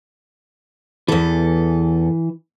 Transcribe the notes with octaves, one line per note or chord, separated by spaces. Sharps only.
E2 E3 A4